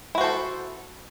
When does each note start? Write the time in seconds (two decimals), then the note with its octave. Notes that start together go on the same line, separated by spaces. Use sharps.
0.15 E4
0.18 F#4
0.21 C5
0.24 A4